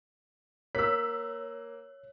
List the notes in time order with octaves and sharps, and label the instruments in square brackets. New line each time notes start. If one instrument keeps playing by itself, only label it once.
[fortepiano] A#3 [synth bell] C#5 [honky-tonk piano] E6 B6